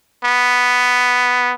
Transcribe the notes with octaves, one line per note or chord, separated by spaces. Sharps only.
B3